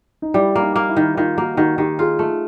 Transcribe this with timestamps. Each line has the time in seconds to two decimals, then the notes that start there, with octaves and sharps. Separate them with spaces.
0.22 D#4
0.34 G3 E4
0.56 A#3
0.62 D#4
0.76 A#3
0.89 E4
0.97 D#3
1.17 D#3 F4
1.37 A#3 F#4
1.57 D#3 F#4
1.78 D#3 G4
1.99 F4 G#4
2.19 A3